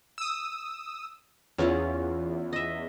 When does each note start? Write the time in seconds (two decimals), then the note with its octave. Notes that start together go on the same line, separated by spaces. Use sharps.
0.18 D#6 E6
1.58 E2 C#4 F4 F#5
2.53 D#5 E5